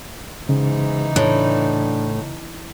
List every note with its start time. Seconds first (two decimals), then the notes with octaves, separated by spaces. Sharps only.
0.49 G#2 C#3 E3 D#4
1.16 A2 D4